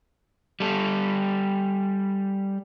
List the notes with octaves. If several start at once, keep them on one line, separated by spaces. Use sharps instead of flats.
G3 A4